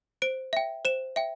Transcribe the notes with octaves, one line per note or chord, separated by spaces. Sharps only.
C5 D7
E5 G5
C5 E7
E5 G5